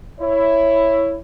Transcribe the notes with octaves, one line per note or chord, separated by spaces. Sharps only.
E4 C#5